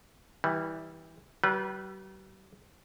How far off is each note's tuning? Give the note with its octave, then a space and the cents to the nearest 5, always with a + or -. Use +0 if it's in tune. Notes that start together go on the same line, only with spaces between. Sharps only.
E3 -20 G3 +0
G3 -45 B4 -15